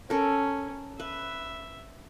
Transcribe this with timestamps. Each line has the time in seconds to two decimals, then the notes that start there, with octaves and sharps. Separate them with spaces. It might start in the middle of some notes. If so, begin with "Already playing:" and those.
0.10 C#4 A4 A#4
1.00 B4 E5